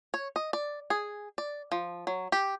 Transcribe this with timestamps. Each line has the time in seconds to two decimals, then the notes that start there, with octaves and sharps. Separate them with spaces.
0.14 C#5
0.36 D#5
0.53 D5
0.90 G#4
1.38 D5
1.72 F3
2.07 F#3
2.32 G4